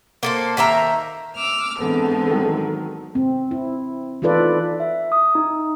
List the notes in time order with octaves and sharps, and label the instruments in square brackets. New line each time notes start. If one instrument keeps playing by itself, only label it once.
[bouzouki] A#3 A4 C5
D#3 A#3 E5 A#5
[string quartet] D6 E6 F6
[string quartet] G#2 D3 C4 [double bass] E3 B3 [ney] A4
[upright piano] D#3 F#3
[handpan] C4
E4
E3 D#4 F4 A4 B4 D5
[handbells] E5
D#6
D#4